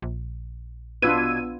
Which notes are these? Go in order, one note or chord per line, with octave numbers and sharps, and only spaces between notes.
A#1
B2 D4 F4 B4 E6 G#6 D#7